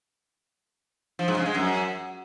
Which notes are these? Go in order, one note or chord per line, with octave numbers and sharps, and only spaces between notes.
F3
G#2
C#3
G#3
F#2